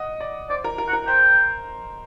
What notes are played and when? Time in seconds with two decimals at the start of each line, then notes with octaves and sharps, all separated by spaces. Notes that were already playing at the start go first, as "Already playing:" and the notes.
Already playing: D#5 F#5
0.21 D5
0.49 C5 D5
0.64 A#4
0.78 A#4
0.88 F#5
0.93 A#4
1.07 C5 G5